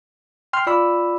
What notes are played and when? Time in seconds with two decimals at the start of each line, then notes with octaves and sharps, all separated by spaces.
0.53 G5 C6 F6
0.67 F4 D5 B5 E6